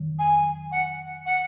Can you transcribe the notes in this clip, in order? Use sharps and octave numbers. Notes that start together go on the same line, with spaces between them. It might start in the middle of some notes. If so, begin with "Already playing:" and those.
Already playing: F2 D#3 F#3
G#5
F#5
F#5